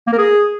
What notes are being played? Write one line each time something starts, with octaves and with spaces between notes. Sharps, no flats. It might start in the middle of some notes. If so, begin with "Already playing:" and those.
A#3
A#4
G#4